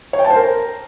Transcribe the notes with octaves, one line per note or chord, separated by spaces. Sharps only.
C#5
G5
A5
C5
A#4